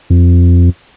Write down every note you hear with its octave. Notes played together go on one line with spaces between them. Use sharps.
F2